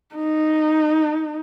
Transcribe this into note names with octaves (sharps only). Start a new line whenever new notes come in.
D#4